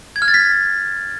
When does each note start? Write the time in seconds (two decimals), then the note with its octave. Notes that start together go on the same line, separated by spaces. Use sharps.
0.16 G#6
0.22 F6
0.28 A6
0.34 B6